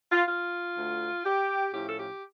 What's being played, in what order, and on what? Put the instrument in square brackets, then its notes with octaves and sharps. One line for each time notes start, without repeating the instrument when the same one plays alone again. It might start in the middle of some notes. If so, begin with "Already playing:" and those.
[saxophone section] F4
F4
D2 D3 A3
G4
A2 F3 C#4 E4 G4
A4
G4